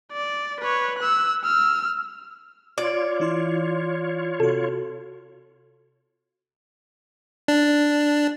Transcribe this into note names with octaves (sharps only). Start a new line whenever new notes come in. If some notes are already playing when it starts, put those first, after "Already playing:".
D5
B4 C#5
E6 F#6
E6 F6
F4 C#5 D5
E3 E4 C6
C3 F#4 A4
D4